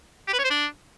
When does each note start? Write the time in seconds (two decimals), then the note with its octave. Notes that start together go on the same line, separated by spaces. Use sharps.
0.27 G4
0.33 B4
0.39 C#5
0.45 C5
0.50 D4